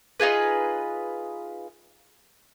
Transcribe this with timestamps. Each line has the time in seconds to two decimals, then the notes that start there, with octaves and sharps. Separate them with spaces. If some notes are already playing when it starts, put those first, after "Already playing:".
0.20 D#4 F4 G#4 B4